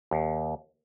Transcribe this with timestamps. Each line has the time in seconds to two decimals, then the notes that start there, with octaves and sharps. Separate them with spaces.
0.11 D#2